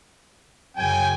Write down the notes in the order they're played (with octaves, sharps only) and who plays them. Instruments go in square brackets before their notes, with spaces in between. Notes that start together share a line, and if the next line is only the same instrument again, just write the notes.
[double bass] F#2 C#3 [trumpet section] G5 G#5